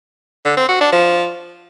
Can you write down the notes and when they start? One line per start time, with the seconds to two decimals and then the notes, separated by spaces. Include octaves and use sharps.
0.45 D3
0.57 C4
0.69 F#4
0.81 D4
0.93 F3